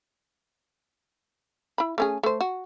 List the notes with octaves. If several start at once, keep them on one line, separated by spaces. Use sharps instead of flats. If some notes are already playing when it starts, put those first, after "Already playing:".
E4 B5
A3 C#4 G#4
A3 C5
F#4